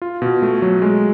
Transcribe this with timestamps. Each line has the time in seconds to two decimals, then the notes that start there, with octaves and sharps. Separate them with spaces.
0.02 F4
0.22 B2
0.42 A3
0.62 F#3
0.82 G#3